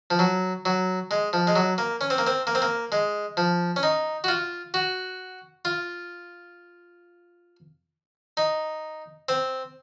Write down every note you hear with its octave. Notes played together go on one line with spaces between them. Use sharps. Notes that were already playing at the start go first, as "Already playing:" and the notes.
F3
F#3
F#3
G#3
F3
G#3
F#3
A#3
C#4
C4
A#3
C4
A#3
C4
A#3
G#3
F3
C#4
D#4
F#4
F4
F#4
F4
D#4
C4